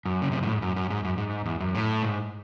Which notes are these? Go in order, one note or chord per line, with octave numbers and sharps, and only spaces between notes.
F#2
C#3
C3
A2
G#2
F#2
F#2
G#2
F#2
G#2
E2
F#2
A2
G#2